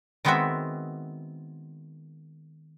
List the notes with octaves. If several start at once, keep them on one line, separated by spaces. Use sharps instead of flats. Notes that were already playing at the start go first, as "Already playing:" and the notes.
D#3 G#3 B3 C4 F#4 E5